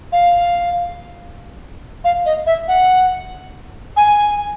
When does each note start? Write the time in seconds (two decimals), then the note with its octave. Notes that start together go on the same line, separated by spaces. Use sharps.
0.12 F5
2.04 F5
2.26 D#5
2.46 E5
2.68 F#5
3.97 G#5